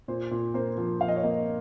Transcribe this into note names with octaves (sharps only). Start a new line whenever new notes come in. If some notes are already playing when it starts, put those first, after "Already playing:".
A#2 C5
A#2
A#3 C5
F3
F3 F5
D#5
C#5
A#3 D#5